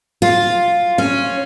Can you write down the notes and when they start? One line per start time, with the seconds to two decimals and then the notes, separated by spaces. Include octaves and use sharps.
0.22 F4
0.98 C#4